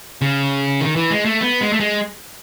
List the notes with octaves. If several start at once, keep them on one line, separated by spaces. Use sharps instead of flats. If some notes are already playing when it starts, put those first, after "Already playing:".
C#3
D#3
E3
G#3
A3
B3
G#3
A3
G#3